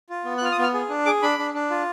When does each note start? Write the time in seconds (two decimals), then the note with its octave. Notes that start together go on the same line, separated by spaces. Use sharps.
0.10 F4
0.25 B3
0.38 F#6
0.41 F4 F6
0.52 D#6
0.58 B3
0.63 F6
0.74 G#4
0.89 D4
1.06 G#4 D6
1.22 D4 B5
1.39 D4
1.54 D4
1.70 F4